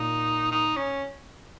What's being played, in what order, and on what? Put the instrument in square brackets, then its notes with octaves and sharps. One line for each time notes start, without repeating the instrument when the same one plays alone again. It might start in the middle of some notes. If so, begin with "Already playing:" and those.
Already playing: [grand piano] A#2 [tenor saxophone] D#4
[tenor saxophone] D#4
C#4